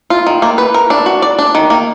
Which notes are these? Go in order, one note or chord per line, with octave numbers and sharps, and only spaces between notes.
F4
D#3
A#3
B4
A#4
D4
F#4
D5
D4
D#3
A#3